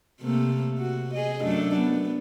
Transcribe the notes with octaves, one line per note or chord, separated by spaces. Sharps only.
C3 A3 A#3
F#4
G#4 D#5
F#2 A3 D4
B3